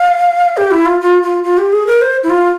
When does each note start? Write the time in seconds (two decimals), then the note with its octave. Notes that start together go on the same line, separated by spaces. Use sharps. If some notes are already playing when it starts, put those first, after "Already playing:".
Already playing: F5
0.57 G4
0.71 E4
0.86 F4
1.01 F4
1.23 F4
1.44 F4
1.58 G4
1.73 G#4
1.87 A#4
2.01 C5
2.24 E4
2.30 F4